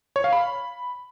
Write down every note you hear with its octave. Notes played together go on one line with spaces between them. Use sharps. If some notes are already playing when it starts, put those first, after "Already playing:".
C#5
F5
B5